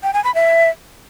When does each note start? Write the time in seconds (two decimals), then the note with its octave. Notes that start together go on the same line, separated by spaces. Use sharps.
0.03 G5
0.14 G#5
0.24 B5
0.35 E5